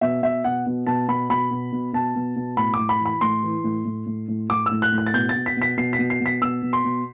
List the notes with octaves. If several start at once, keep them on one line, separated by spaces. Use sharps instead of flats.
B2 E5
B2 E5
B2 F#5
B2
B2 A5
B2 B5
B2 B5
B2
B2
B2 A5
B2
B2
A2 B5
D6
A2
B5
E3 B5
A2 C6
E3
A2
A2
A2
A2
A2 D6
E6
A2
F#6
A2
F#6
A6
B2 G6
A6
B2
B6
B2 B6
B2 C7
B6
B2
C7
B2
B6
B2 E6
B2
C6
B2